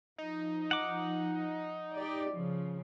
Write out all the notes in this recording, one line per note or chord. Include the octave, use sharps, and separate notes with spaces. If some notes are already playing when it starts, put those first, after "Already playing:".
F3 D#4
F#5 D6
G4 D5
C#3 F3